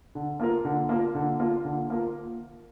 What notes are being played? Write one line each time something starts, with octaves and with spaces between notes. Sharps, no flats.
D3
A#3 F4 A#4
D3
A#3 F4 A#4
D3
A#3 F4 A#4
D3
A#3 F4 A#4